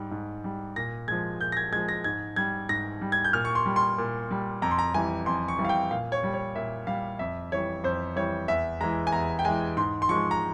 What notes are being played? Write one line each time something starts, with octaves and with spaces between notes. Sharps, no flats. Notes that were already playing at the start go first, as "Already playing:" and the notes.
Already playing: G#2 G3
G#2
G3
A#2 A#6
F3 G#3 G#6
A#2 G6
A#6
G#6
F3 G#3 G#6
A#6
G#2 G#6
G3 G#6
G#2 A#6
G3
G#6
G6
A#2 F6
C#6
C6
G3
C6
A#2
G3
F2 A#5
C6
A#5
E3 G3 G#5
F2 C6
C#6
E3 G3
F5
G5
A#2 F5
C#5
G3
C#5
A#2 E5
G3 F5
F2 E5
E3 G3 C#5
F2 C5
E3 G3 C#5
E2 E5
E3 G#3 A#5
G#5
E2 A#5
G5
E3 G#3 G#5
G#2 C6
C6
F3 G#3 C#6
A#5